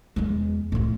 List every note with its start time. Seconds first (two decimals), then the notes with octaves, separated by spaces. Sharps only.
0.16 E2 G#3
0.72 A2 F4